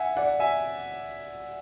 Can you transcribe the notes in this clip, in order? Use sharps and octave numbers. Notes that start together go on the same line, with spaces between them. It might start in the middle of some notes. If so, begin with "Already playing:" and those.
Already playing: E5 F#5 G#5
D5 F#5
E5 G#5